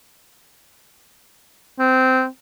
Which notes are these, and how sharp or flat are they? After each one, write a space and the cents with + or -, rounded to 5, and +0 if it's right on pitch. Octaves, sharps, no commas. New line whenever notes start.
C4 -15